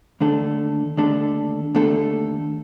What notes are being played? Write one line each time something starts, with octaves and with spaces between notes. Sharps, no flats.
D#2 D3 A3 D4 A4
D#2 D3 A3 D4 A4
D#2 D3 A3 D4 A4